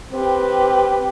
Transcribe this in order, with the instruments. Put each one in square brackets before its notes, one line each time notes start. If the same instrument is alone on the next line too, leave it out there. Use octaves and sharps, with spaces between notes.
[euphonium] C4 [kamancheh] G4 B4